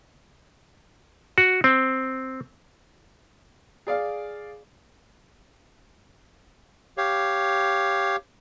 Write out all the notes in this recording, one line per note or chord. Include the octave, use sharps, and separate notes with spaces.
F#4
C4
G#4 D5 F5
G4 C#5 F5